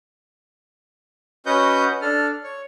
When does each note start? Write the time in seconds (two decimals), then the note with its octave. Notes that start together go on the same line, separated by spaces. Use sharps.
1.46 C#4 F#4 B4 D#5 F#5 G6
2.02 D4 A4 F6
2.43 C#5